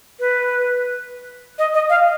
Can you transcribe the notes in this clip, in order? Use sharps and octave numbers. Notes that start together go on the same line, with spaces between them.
B4
D#5
D#5
F5